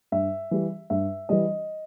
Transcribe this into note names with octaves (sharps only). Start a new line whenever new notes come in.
G2 E5
E3 G3
G2 E5
E3 G3 D#5